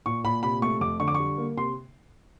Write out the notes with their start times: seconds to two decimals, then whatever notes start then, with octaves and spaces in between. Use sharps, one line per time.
0.06 A#2 C#6
0.24 A#2 B5
0.43 C3 B5
0.62 A3 C#6
0.81 F2 D6
1.00 D3 C#6
1.08 D6
1.15 C#6
1.20 G3
1.38 A#3
1.57 C3 C6